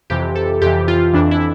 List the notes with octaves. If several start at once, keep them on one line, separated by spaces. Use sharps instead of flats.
F2 C3 E3 G4
A4
F2 C3 E3 G4
F4
F2 E3 D4
E4